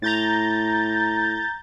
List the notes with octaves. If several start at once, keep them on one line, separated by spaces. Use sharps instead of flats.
A2 A#5 G6 A6